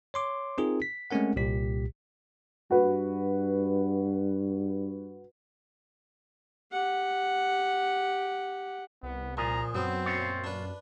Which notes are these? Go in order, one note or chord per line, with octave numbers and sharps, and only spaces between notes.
C#5 C6 D6
C4 D#4 F4 G#4 A#4
B6
G#3 A3 C4 C#4 A#4 F#5
C2 A#2 G4 B6
G2 F#4 B4
G4 F#5
C2 B3
A#2 F3 G#4 A#5
F#2 F#3 B3 C4
A#2 F4 C#5
D4 B4